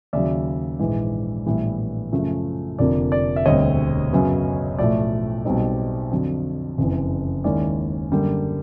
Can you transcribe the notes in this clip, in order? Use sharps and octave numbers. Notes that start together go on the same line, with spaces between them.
D#2 C#3 F#3 D5 E5
A#1 G#2 E3 G#3
A#1 A2 E3 G3 B3
F#2 C#3 F3 A3
F1 F2 D3 F3 A#3 D5
D5
E5
E1 D2 D3 G3 C4 C#5 D#5
F#2 C#3 F#3 B3
B1 A2 F3 A3 D5
B1 B2 G3 C4 D#4
F2 D3 F#3
F#1 F2 C#3 E3
D#2 D#3 G#3 C#4 E4 D5
F#2 D3 G3 A#3